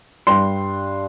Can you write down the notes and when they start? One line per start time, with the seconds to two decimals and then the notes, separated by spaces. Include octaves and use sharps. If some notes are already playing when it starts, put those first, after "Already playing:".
0.27 G2 G3 D4 C6